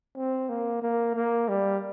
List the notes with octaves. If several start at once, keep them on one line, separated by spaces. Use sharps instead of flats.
C4
A#3
A#3
A#3
G3